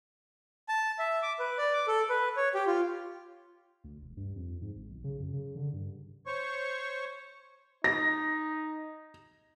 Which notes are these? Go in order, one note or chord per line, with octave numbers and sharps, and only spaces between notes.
A5
E5
D6
B4
D5
D6
A4
B4
C#5
G4
F4
D2
E1
G2
F2
G#2
G#1
B1
C#3
F#2
C#3
D3
G2
C5 C#5 C#6
D#4 A#6